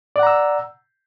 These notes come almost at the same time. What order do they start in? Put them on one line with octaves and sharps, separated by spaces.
D5 F#5 A#5 E6